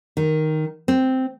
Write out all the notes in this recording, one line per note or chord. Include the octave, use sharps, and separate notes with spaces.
D#3
C4